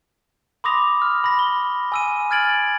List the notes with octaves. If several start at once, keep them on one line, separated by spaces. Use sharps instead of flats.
B5 C6 D6 D#6 A#6 F7
F6
B5 A#6
G7
G#5 E6 D#7
F6 G#6 A6 D7 F#7